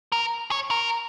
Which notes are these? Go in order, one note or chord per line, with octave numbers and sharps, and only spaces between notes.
A#4
C#5
A#4